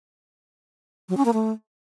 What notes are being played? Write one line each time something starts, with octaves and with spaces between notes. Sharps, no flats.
F#3
C#4
A#3
A3